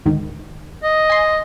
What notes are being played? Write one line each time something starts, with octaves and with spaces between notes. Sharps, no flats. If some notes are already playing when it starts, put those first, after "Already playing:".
D2 G#2 D#3
D#5
G#5 C6